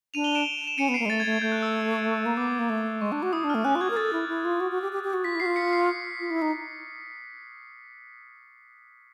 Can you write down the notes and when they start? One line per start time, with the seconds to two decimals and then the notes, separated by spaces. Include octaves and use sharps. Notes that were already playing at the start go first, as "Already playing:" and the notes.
0.14 D4 D#7 F7
0.24 F7 G7
0.35 D7 E7
0.67 E7
0.78 C#4 C#7 D#7
0.89 B3
0.94 C7 D7
1.00 A#3
1.06 G#3
1.10 A3 A6
1.20 G#6
1.26 A3
1.32 G#6
1.42 A3 G6
1.52 F#6
1.62 E6
2.26 A#3
2.37 B3 D6
2.59 A#3
2.70 A3
3.01 G#3 C#6
3.12 D4
3.18 F#4 D6
3.33 E4 D#6
3.44 D4
3.50 F6
3.55 A3
3.64 C#4 F#6
3.75 F4
3.81 F#4 G#6
3.90 A#4
3.96 A4 A6
4.13 E4
4.29 E4
4.45 F4
4.60 F#4
4.71 F#4
4.82 G4
4.92 G4
5.03 G4
5.13 F#4
5.24 F4 B6
5.35 E4
5.40 F#4 C7
5.46 F4
5.56 B6 C#7
5.73 C7
6.20 F4
6.30 E4
6.42 D#4